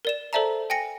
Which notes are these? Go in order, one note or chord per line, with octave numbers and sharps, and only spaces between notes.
A#4 D5 E7
A4 C5 D5 E5 A5 A#5
G5 G#5 A#6 C#7